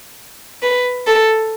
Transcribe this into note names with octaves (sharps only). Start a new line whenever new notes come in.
B4
A4